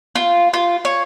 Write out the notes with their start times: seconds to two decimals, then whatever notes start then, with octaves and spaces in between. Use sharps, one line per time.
0.16 F4
0.54 F4
0.85 C#5